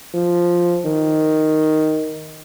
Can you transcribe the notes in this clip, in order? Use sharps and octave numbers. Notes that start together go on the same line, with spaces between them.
F3
D#3